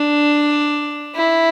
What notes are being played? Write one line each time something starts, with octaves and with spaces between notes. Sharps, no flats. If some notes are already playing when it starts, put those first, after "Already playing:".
Already playing: D4
E4